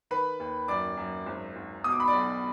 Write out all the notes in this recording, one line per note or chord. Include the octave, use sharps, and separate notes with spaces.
D#3 B4 B5
D#2
F#2 D5 D6
F#2
G#1
G#1
B2 D#6
D6
B5
D5 D6
B1